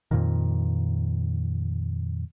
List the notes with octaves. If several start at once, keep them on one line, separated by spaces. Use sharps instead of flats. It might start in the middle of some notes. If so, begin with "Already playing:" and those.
F2 A#2 D#3